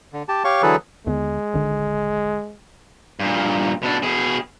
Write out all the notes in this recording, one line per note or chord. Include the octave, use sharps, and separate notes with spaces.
D3
G4 A5
G4 C#5 F5 C#6
D3 E3 F#3 G#4 A4 B4
D#2 D3 G#3 B3
D#1 G#1 D3
G2 A#2
B2 D4
B2 G#4